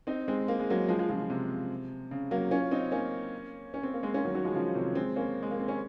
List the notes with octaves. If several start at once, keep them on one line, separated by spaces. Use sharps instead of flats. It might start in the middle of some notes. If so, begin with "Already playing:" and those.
C4 D#4
G#3 C4
A#3
G#3
F#3 A#3
F3 G#3
F3 G#3
C#3 F3
C#3
C3
C#3
F#3 A#3
C#4 F4
C4 D#4
A#3 C#4
C#4
C4
A#3
G#3 C4
A#3 C#4
D#3 F#3
D#3 F#3
F3 G#3
C#3 F3
C3 D#3
G#3 C4
A#3 C#4
G#3
A#3
C4
C#4